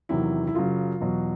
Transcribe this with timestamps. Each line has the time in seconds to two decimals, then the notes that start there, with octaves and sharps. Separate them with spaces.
0.09 E2 C3 D#3 F#3 E4
0.47 E4
0.54 F#2 C#3 F#3 F4
1.00 E2 B2 F#3